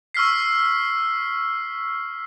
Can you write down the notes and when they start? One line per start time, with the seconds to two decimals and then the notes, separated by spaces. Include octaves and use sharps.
0.14 C#6 E6 F6 B6 C7